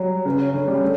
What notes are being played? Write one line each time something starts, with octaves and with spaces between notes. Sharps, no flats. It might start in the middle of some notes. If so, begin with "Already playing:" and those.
Already playing: F#3 G3 C#5
C#3 B4
C#5
D3 C#5
G3
A3